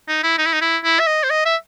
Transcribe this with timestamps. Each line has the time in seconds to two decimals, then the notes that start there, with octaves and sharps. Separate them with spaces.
0.08 D#4
0.23 E4
0.38 D#4
0.46 E4
0.53 D#4
0.61 E4
0.84 E4
1.00 E5
1.07 D#5
1.23 C5
1.30 D#5
1.45 E5